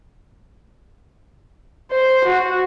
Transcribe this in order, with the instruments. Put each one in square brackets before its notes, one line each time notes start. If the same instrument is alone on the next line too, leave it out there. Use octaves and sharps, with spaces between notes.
[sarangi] C5
F#4